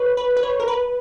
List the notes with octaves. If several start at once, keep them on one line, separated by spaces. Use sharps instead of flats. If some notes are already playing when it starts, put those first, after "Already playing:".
Already playing: B4 C#5
B4
B4
C#5
A#4
B4